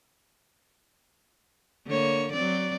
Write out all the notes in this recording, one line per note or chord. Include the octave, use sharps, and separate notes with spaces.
D3 A#3 C#5
F#3 C4 D5